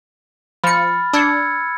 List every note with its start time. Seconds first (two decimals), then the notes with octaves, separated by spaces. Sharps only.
0.64 F3 B5 F6 A6 C#7
1.13 D4 E6 G#6 C#7